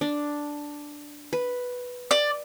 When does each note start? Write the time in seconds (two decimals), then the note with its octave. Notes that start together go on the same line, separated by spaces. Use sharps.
0.01 D4
1.33 B4
2.11 D5